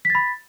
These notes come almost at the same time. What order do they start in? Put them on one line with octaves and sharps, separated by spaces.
B6 A6 B5